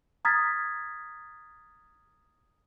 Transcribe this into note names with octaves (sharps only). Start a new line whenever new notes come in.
A#5 D#6 F6 G#6 A6 B6